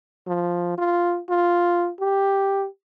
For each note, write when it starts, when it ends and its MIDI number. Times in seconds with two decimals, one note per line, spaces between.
0.27 0.73 53
0.78 1.20 65
1.30 1.90 65
2.00 2.66 67